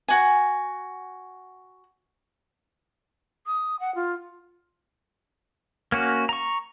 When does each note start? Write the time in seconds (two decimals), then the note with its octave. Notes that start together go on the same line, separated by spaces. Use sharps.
0.08 F#4 G#5
3.47 D#6
3.80 F#5
3.95 F4
5.92 A#3 C#4 F#4
6.29 A#5 C#6